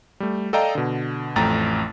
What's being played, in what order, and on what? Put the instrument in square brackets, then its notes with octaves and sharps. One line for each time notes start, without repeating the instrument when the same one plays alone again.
[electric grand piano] G3 A3
A4 D5 D#5 F5 G5 A#5
B2 D3
A1 F2 A3 G5 A#5 A6